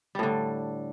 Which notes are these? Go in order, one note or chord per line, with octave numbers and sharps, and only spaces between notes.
A2 D3 G3